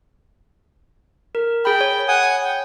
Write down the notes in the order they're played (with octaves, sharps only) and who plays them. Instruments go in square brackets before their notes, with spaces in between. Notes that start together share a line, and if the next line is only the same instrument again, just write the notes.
[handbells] A#4
[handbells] G#4 B5 [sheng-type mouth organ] G5
[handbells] C#5
[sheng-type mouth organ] F#5 G#5 D#6
G5